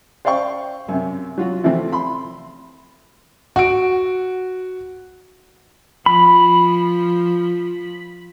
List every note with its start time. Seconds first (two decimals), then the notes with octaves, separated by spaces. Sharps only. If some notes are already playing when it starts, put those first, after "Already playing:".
0.25 C5 D5 F5 G5 C#6
0.88 F#2 C3
1.38 F#3 F4 F#4
1.63 C3 E3 F3 A3 C4
1.92 B5 C6
3.56 F#4 D7
6.06 F3 B5